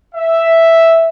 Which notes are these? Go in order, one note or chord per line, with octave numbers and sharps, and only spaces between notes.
E5